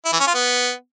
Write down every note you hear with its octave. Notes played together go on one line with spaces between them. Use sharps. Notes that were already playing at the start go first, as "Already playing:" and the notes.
E4
E3
C#4
F4
B3